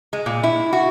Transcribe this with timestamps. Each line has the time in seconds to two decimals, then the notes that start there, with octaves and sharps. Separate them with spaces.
0.13 G#3
0.26 A#2
0.43 E4
0.73 F#4